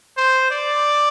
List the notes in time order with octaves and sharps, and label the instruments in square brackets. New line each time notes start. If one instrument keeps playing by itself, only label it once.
[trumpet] C5
D5